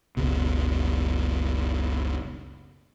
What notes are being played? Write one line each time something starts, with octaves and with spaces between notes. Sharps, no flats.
F#1 C#2 B2